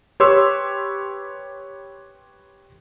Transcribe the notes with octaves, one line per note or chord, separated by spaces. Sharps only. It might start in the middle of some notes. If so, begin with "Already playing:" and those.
G4 B4 C#5 C6 E6